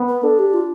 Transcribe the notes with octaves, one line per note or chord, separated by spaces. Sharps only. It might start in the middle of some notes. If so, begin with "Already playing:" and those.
Already playing: B3
B4
D4 A4
G4
F4